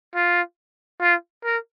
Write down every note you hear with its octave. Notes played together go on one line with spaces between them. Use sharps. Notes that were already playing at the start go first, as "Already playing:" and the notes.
F4
F4
A#4